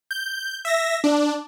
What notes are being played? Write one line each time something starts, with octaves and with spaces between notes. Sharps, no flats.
G6
E5 A#6
D4